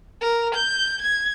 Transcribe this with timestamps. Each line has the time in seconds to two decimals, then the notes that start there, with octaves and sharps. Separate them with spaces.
0.21 A#4
0.54 G6
1.02 G#6